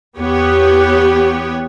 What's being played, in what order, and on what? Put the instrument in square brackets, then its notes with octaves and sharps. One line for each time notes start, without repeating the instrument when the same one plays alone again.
[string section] E2 B3 C#5 [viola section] G4